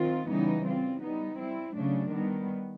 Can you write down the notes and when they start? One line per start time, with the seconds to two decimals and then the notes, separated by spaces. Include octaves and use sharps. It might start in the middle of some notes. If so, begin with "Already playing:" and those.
Already playing: D#3 C4 F4
0.27 C#3 E3 G3 B3 D#4
0.65 G3 C4 F4
1.01 G3 B3 D#4
1.38 G3 C4 E4
1.76 C#3 F#3 A3 D4
2.12 D#3 G3 B3